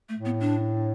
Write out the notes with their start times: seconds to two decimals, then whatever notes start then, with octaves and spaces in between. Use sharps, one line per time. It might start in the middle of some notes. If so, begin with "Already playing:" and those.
0.09 A3
0.17 A2
0.25 B3
0.41 D4